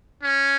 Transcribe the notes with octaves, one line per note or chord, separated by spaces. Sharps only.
C#4